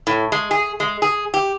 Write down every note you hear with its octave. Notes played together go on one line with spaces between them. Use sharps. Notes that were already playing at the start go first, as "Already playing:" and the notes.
A2
G#3
G#4
G#3
G#4
G4